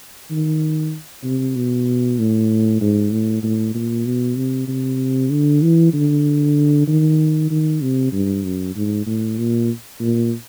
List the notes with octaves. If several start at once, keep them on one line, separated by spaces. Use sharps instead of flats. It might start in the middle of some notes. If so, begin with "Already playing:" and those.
D#3
C3
B2
A2
G#2
A2
A2
A#2
B2
C3
C3
D3
E3
D3
D#3
D#3
C3
G2
F#2
G#2
A2
A#2
A#2